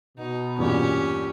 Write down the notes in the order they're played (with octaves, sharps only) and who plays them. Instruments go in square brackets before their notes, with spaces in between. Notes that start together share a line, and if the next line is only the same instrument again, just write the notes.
[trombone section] B2 [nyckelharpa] D#4
[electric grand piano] E2 G2 A#2 [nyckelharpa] C#4 G4